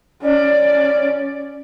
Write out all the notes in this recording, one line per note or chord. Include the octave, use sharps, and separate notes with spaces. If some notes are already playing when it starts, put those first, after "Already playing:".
C#4 D5